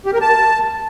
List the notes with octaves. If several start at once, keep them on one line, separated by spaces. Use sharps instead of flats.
G4
A#4
A5